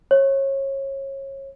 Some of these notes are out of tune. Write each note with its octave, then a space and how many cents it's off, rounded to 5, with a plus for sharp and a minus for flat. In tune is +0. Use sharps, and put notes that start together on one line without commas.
C#5 -25